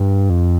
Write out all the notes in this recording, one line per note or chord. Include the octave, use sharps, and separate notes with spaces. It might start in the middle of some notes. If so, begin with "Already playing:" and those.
Already playing: G2
F2